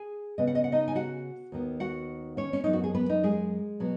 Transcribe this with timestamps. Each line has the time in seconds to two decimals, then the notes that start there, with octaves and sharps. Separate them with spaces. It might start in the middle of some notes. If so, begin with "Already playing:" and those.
Already playing: G#4 G#5
0.38 C#3 B3 D#5
0.47 F#5
0.55 D#5
0.64 F#5
0.72 D#4 D#5
0.88 G#5
0.95 F#4 F#5
1.52 D#2 D#3 B3
1.80 F#4 F#5
2.37 C#4 C#5
2.53 C#4
2.64 F#2 F#3 B3 D#4
2.73 F#4
2.84 G#4
2.95 B3 B4
3.09 D#4
3.23 G#3 G#4
3.80 B2 F#3 B3